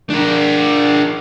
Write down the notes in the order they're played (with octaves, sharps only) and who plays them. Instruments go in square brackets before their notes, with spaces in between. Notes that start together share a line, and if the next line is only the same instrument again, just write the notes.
[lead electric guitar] D4 A#4